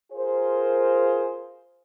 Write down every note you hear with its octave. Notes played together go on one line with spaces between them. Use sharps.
F4 G#4 A#4 C5